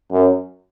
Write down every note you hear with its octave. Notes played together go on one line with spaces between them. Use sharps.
F#2